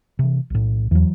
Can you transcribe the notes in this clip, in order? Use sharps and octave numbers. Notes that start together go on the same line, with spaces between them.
C3 E3
B1 A2
E2 E3 F#3